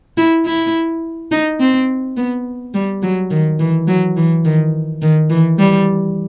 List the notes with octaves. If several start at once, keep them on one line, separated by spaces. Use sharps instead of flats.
E4
E4
D#4
C4
B3
G3
F#3
D#3
E3
F#3
E3
D#3
D#3
E3
G3